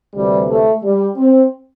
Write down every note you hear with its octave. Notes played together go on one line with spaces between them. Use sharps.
D2 C3 E3 G3
A3
G3
C4